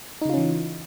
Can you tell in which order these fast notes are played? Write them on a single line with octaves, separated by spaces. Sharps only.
D#4 C#3 F4 C#4 E3